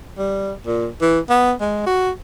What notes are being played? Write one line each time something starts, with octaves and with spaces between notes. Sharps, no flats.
G3
A#2
E3
B3
G#3
F#4